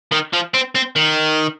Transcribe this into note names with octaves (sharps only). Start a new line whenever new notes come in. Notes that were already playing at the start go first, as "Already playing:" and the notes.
D#3
F3
C4
C4
D#3